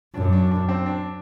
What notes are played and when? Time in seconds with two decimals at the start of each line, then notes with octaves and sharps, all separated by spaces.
0.14 F#2 D4
0.33 D4
0.51 D4
0.69 C4
0.86 D4